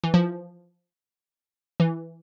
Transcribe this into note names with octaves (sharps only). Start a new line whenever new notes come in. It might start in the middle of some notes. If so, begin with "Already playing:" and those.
E3
F3
E3